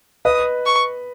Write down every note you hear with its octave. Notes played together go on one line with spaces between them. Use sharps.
B4 D#5 D#6
C#6